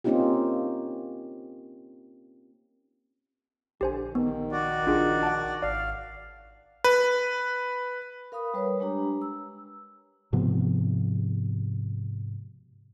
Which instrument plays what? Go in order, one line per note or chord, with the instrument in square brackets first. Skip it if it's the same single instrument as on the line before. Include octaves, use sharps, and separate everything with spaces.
[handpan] A#3 C4 C#4 D#4 F4 G4
[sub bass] A#1 [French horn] D3 [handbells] G4 C5 G#5
[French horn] D#3 [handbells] B3
[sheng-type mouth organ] F#4 D5
[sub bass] A#1 [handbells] D4 F4 G#4
[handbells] F#5 A5
[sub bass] G#1 [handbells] D5 [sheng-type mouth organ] F5
[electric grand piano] B4
[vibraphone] A#4 F5 B5 D#6
G3 B4 C#5
G#3 D4 G4 A#5
E6
[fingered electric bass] G#2 C3 F3 B3